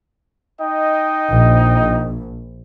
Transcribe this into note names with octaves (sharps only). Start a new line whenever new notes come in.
D#4 D#5 G5
A#1